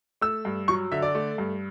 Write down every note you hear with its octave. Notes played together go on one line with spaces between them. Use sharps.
A3 E6
G2
F#3 C#6
D3 E5
D5
A3
G2